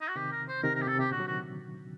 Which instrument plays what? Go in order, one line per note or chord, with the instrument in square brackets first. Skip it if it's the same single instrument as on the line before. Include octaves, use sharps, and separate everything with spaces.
[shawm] D#4
F#4
[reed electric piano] C3 D#3 [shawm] G4
[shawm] A#4
C5
[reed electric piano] C3 D#3 [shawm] A#4
[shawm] A#4
G4
[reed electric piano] C3 [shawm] A4
[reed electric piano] C3 [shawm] G4
[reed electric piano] A#2 D3 [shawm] F#4
[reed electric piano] F#3
[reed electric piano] C3 D#3 [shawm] F#4